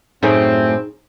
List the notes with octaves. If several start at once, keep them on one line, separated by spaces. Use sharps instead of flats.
F#2 A2 A3 C4 D#4 G#4 C#5